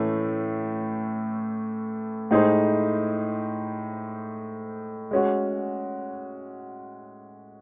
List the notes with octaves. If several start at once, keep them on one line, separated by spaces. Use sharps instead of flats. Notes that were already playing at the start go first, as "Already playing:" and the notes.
Already playing: A2 E3 A3 C#4
A2 G#3 D#4 G#4 C5
G#3 C#4 F#4